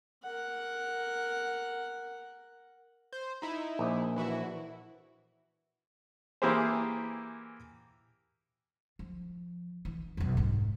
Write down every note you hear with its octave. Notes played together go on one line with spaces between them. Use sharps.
A#4 F#5
C5
D#4 E4
A#1
E3 E4 F#4
E3 A#3 E4 G4 G#4 C5
F3
E3
B1 F2
G#2 G#3